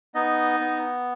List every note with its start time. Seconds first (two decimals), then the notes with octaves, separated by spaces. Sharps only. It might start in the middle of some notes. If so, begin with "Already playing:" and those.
0.15 B3 D#4 D#5
0.60 B3